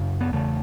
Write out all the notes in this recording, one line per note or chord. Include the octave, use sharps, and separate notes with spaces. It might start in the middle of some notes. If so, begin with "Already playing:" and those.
Already playing: F#2 C#3
B3
E2 C#3 A3